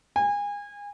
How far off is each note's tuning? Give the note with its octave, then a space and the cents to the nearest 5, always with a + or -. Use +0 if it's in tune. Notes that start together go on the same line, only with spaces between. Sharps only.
G#5 -30